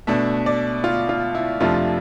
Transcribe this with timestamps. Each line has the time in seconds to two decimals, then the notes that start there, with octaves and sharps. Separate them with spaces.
0.07 B2 A3 D4 E5
0.46 D5
0.84 F4
1.09 F4
1.35 E4
1.60 F2 C3 F3 A3 D4 F4